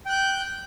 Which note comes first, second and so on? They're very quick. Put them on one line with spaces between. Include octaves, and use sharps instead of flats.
G5 F#6 G6